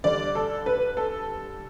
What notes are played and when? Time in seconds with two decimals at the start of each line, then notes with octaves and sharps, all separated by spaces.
0.04 D3 G3 D5
0.35 A4
0.66 B4
0.97 A4